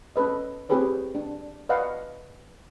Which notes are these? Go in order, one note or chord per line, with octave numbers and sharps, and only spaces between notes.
C#4 A4 B4 D#5
C4 E4 G4 G#4 B4 C#5
D4
B4 D5 D#5 F5 F#5